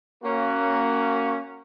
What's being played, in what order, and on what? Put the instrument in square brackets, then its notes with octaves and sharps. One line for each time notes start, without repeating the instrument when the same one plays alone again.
[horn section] A#3 C#4 F#4